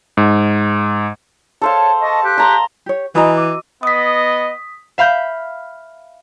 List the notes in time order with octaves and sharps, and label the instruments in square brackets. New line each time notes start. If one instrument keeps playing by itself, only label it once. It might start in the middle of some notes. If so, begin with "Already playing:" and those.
[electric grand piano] G#2
[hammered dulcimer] A4 C5 F5 [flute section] C#5 A5
[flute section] D#5 A5 C#6
G4 F#6
[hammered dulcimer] A5 A#5 C6
[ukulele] G4 C#5
[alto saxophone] E3 [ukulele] F#4 D#5 A#5 [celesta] G#5 B5 D#6
[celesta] D6 E6 D#7
[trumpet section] B3 D#5 [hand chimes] D#6 B6
[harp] E5 F5 B5 G6